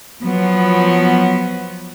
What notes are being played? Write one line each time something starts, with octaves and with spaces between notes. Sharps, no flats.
F3 F#3 B3